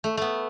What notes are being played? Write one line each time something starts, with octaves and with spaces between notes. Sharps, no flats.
A3
A3 B3